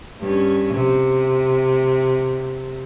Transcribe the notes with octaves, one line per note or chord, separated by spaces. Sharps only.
G2 C#4
C3